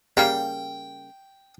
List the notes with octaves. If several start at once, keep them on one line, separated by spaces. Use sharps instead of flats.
C#3 G3 A#3 G5